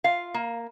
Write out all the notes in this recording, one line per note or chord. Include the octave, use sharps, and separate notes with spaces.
F4 F5
A#3